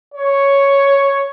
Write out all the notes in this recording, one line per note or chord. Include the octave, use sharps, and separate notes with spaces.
C#5